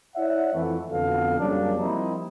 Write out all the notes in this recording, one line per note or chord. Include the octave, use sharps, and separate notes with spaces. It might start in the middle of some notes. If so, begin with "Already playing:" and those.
E4 C#5 D5 E5 F#5
F2 E3 A3
F2 B2 D3 B3 A4 F5
F#2 C#3 G3 A#3 D4
F3 G3 A#3 C4 D#4 E4